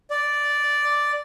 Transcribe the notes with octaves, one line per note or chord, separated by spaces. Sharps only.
D5